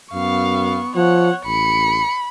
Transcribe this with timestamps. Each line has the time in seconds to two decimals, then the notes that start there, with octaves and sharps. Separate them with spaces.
0.13 F#2 B3 F5 C#6
0.96 F3 C#5 F#5
1.46 A1 B5 C#7